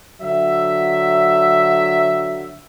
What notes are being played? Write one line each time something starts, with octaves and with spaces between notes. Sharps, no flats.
D3 F#3 E5